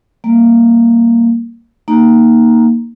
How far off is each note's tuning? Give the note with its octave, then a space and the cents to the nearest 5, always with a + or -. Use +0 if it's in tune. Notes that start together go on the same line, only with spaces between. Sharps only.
G3 +0 A#3 -5
A#3 +0 D#4 +0 A#5 +0